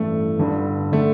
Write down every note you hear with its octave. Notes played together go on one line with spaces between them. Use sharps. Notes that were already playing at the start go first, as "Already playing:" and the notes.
Already playing: A1 G2 E3 A3
G1 G2 D3
D3 A3